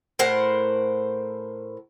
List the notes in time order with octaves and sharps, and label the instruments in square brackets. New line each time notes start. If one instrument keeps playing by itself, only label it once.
[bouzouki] A2 A#4 C5 F#5